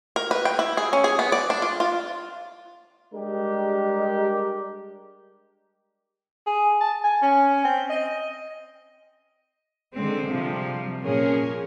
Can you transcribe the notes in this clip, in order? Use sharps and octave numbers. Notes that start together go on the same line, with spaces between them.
A#4
B4
G5
E4
G#4
C#4
G#4
B3
D5
D4
F4
F4
G3 G#3 D4 G4 A#4
G#4
A5
G#5
C#4
C4
D#5
D3 G#3 C4
C3 F3 G3
A#2 F3 C#4 G#4 A#4